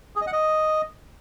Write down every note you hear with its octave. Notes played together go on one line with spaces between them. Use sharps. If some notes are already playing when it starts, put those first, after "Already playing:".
G#4
D#5
F#5
D#5